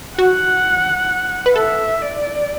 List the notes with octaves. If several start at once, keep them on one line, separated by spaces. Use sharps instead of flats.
F#4 F#5
B4
A4 E5
D5